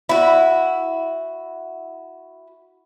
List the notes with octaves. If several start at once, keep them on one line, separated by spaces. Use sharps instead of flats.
E4 F#4